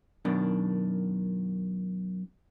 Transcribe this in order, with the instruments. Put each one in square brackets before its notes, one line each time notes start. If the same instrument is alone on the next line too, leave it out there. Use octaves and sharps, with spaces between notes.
[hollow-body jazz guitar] F#2 B2 D#3 D4